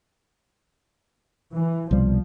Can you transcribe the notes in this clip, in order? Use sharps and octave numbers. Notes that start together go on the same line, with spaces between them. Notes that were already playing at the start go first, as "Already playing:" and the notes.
E3
C2 B2 F3 G3